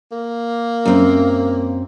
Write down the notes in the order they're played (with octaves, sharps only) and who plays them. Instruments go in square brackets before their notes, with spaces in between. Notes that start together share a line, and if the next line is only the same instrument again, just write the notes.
[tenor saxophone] A#3
[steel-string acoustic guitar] F#2 C4